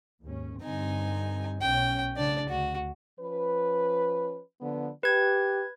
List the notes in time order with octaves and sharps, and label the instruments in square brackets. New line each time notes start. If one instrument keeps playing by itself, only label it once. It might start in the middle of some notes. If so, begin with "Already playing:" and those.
[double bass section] D#2 G#2 C#4
[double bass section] G2 D3 C4 [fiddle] D#4 G#5
[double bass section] B1 C#4 [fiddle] G5
[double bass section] A2 C#3 [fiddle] D4 D5
[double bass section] D2 [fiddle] F#4
[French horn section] F3 C#4 B4
D3 F3 B3
[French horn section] G4 [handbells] B4 G#6